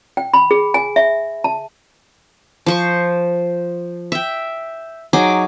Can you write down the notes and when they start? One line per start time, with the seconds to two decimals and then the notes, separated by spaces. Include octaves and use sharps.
0.17 G5
0.34 B5
0.51 G#4
0.74 G#5
0.96 E5
1.44 A5
2.66 F3 C5 C#6
4.12 E5 G5
5.13 F#3 D#4 G#4 D6